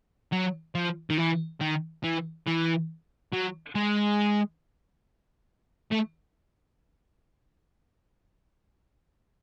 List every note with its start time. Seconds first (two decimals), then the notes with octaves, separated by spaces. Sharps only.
0.32 F#3
0.75 F3
1.10 D#3
1.18 E3
1.61 D#3
2.04 E3
2.47 E3
3.32 F#3
3.75 G#3
5.91 A3